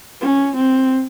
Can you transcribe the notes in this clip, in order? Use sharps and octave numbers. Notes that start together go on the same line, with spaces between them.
C#4
C4